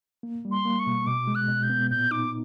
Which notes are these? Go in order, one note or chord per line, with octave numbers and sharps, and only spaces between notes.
A#3
G3
C6
A#3
C#6
B2
B2 D6
G#3
F#6
B2
G6
B3
A#2 G6
D#4 D6